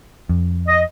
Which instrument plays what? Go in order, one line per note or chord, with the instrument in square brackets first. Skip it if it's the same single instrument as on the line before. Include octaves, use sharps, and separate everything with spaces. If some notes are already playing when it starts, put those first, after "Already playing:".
[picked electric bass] F2
[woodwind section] D#5